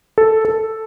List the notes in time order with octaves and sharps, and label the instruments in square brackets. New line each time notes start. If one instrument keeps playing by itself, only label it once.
[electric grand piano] A4
A4